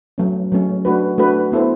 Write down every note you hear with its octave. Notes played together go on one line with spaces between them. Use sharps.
F#3 A3 C#4
F#3 A3 C#4
A3 D4 F#4 B4
A3 D4 F#4 B4
B3 E4 A4 C5